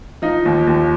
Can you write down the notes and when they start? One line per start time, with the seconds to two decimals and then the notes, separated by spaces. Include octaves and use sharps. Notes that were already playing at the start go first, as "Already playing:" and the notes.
0.22 F3 D#4
0.45 D#2
0.67 D#2